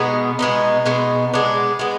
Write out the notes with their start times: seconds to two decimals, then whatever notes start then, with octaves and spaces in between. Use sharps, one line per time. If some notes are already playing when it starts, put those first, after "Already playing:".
Already playing: B2 G#3 B3 D#4
0.39 B2 G#3 B3 D#4
0.86 B2 G#3 B3 D#4
1.33 G#3 B3 D4
1.79 G#3 B3